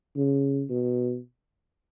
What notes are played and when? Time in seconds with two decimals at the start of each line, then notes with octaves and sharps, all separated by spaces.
0.16 C#3
0.70 B2